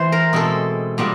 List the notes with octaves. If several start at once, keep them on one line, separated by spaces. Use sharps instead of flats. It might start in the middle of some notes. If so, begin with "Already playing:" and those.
Already playing: E3 C5
A#4
B2 G#3 C4 A4
A#2 G3 B3